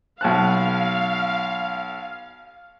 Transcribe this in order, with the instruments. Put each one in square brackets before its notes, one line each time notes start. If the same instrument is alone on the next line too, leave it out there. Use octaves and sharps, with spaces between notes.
[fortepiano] B1 A5 F#6 [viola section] F5